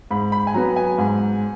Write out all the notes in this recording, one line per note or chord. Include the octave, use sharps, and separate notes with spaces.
G#2 B5
B5
G#5
F#3 B3 A#5
G#5
G#2